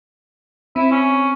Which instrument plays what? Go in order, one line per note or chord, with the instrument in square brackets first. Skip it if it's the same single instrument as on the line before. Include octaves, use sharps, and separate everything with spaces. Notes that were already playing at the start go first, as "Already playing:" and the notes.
[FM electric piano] C4 [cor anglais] E4
[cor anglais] C#4